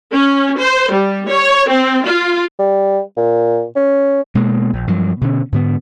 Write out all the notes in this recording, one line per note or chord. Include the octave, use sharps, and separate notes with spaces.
C#4
C5
G3
C#5
C4
F4
G3
A#2
C#4
B2 G#3 A#3 B3
A#1
G2 F3 F#3
B2 D3 C#4
G#2 D3 B3